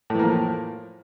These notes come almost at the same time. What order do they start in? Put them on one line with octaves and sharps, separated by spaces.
A2 E3 A#3 F3